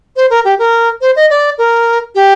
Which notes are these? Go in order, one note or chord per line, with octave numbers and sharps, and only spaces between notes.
C5
A#4
G4
A#4
C5
D#5
D5
A#4
G4